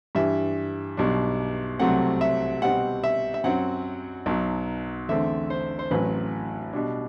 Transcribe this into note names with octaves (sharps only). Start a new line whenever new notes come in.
G2 E3 G3 E5
B1 B2 G3 D4
C2 C3 F#3 A3 C4 F#5
E5
B2 G3 C4 F#5
E5
E5
F#2 F#3 C4 F#5
B1 B2 F#3
E2 D3 A3 C4 E5
C5
C5
A1 A2 F#3 C4 B4
B2 G3 D4